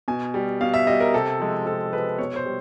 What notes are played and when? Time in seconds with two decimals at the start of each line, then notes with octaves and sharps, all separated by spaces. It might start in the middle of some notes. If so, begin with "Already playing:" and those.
0.08 B2 G#5
0.34 G3
0.61 B2 F5
0.74 E5
0.87 G3 D#5
1.00 A#4
1.14 C3 A4
1.39 F3 G#3
1.66 C3 A4
1.93 F3 G#3 B4
2.18 B2 C#5
2.36 C5
2.46 G3